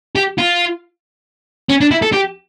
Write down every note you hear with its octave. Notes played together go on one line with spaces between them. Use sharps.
G4
F4
C#4
D4
E4
A4
G4